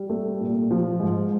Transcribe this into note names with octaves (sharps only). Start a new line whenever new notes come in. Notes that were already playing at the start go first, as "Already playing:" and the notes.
Already playing: G3
A3
A#2
F3
G#2